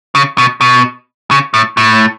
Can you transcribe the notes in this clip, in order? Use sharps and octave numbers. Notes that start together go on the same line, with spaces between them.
C#3
B2
B2
C#3
A2
A2